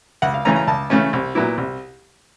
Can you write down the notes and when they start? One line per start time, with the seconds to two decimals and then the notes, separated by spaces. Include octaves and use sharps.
0.22 C#2 F#5
0.34 F5
0.45 C#3 E3 A3 C#4 A#5
0.56 A#5
0.67 C#2 A5
0.90 C#3 E3 A3 C#4
1.13 C2
1.35 A#2 F#3 B3 E4
1.58 C2